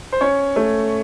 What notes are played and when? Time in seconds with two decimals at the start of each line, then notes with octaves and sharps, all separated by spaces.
0.12 C5
0.21 C#4 C#5
0.56 A3